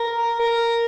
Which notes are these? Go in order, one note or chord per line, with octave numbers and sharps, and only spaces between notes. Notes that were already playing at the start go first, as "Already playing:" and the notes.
Already playing: A#4
A#4